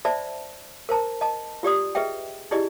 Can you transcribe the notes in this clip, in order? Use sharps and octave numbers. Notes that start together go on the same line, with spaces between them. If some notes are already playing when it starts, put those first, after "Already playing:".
C5 D5 E5 A5 B5
A#4 C5 A5 A#5
D#5 A5
F4 G4 D5 D#6
G#4 B4 D#5 E5 G5
D#4 E4 G4 G#4 D5 D#5